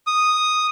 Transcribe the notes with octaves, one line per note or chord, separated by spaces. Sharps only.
D#6